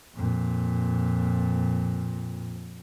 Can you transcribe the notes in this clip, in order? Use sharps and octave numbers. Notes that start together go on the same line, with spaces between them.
F2 A#2